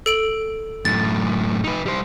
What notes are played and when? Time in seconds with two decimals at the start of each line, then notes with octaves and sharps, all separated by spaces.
0.06 A4 D7 F#7
0.85 F#2 A2 A6
1.64 D#4 B4
1.86 G3 C5